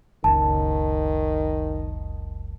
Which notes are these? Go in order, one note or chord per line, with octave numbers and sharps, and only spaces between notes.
F#1 C#2 D#3 A5